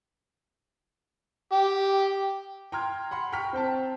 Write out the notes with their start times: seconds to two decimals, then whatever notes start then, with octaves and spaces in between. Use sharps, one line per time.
1.52 G4
2.72 G5 A#5 C6 F6 G#6
3.11 F#5 B5 C6
3.32 G5 A#5 C#6 F6 B6
3.53 C4 C5 G5 A5